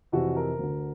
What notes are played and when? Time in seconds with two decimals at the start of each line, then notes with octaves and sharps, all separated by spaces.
0.12 F2 C3 E3 F#4
0.37 A#4
0.59 D2 D3